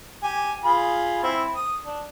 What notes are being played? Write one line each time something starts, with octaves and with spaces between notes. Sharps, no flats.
G4 G#5
F4 G#4 B5
C4 E4
D#6
D4